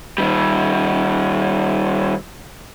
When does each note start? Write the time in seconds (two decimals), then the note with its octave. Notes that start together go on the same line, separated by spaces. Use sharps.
0.18 D#3 G3